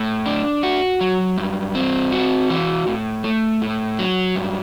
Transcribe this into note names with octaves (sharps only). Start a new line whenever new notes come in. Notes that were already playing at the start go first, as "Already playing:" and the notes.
Already playing: A2
D4
F#4
F#3
G2
C4
F#4
E3
A2
A3
A2
F#3
G2